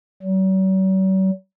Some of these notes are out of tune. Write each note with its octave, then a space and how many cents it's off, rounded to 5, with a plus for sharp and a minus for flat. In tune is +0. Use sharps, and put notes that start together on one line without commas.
F#3 +45